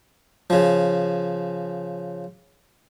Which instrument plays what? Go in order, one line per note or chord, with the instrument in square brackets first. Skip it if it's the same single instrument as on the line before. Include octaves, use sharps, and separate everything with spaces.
[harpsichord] C#3 F3